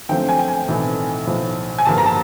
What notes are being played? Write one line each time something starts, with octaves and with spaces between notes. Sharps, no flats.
F#2 D3 F3 A3 C4 G5
G#5
G5
G#5
B1 A2 E3 A3 C4
B1 A2 F3
G#5
A1 G2 D3 F3 A#3 A5
A#5
A5